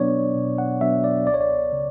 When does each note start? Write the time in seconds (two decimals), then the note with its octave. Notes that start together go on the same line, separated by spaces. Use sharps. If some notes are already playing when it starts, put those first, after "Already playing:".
Already playing: B2 F#3 B3 D4 C#5 D5
0.35 B2
0.58 F#5
0.81 F#3 B3 D4 E5
1.04 D5
1.26 C#2 D5
1.34 C#5
1.41 D5
1.72 C#3